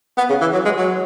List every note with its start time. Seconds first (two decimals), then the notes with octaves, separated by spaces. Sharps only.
0.18 B3
0.30 C#3
0.41 E3
0.54 F#3
0.65 G#3
0.77 F#3